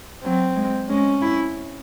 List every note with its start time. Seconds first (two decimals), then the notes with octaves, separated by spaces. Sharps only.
0.24 F#3 C4
0.56 G#3
0.89 G#3 C#4
1.21 E4